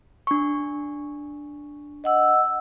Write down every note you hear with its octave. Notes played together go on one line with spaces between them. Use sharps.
D4 C#6
D#5 F#5 E6